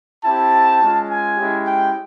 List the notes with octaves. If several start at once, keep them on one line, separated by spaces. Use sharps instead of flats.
C4 E4 G4 A5
G#3 C#4 F4
G#5
G#3 C#4 E4 G4
G5